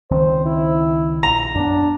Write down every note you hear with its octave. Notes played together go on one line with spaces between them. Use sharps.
C#2 D#3 C4 C5
E4
A#1 A#5
F#2 B3 D4